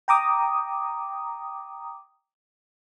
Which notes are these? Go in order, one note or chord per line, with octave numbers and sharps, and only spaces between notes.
G5 A#5 D6 D#6